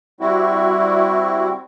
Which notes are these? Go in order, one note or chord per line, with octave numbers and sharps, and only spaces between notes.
G3 C4 E4 F#4